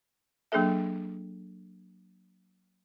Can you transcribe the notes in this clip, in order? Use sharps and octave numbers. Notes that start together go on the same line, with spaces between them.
F#3 A#3 D4 G#4 A4 E5